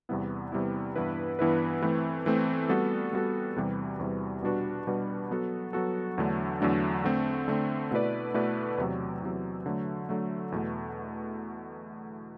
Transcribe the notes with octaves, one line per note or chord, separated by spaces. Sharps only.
E2 C3 G3 B3 E4
E2 C3 G3 B3 E4
G2 E3 B3 E4 B4
G2 E3 B3 E4 B4
E3 A3 C4
E3 A3 C4
G3 B3 F#4 A4
G3 B3 F#4 A4
E2 C3 E3 G3
E2 C3 E3 G3
B2 G3 D4 F#4 B4
B2 G3 D4 F#4 B4
F#3 B3 F#4 A4
F#3 B3 F#4 A4
E2 D3 F#3 A3 D4
E2 D3 F#3 A3 D4
D3 A3 C4
D3 A3 C4
B2 A3 E4 B4 D5
B2 A3 E4 B4 D5
E2 C3 F#3
E2 C3 F#3
D3 F#3 A3
D3 F#3 A3
E2 B2 A3